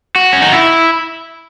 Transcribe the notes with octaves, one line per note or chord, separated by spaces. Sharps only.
F#4
C#4
D#4
E4